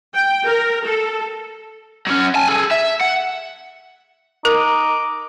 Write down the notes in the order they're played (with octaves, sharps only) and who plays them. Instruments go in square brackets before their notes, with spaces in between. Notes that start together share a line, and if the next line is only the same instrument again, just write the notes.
[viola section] G5
A#4
A4
[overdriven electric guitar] F#3 C#4
G#5 A5
G#4 A4
E5
F#5
[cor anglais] D#4 [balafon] A#4 [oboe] D6